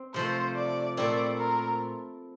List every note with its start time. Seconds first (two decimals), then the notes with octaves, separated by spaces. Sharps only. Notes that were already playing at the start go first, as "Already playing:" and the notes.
Already playing: C4
0.14 C3 F3 A3 C5
0.56 D5
0.97 A#2 A3 C4 E4 D5
1.38 A#4